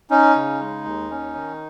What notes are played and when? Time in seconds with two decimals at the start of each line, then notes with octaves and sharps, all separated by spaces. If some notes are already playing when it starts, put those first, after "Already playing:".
0.10 C#4 D#4
0.35 C#3
0.60 G#3
0.85 D#2
1.10 C#4
1.35 D#3